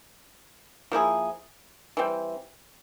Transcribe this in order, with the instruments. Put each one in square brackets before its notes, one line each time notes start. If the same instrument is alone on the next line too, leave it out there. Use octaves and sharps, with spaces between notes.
[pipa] F3 A#3 E4 G#4
E3 G3 C4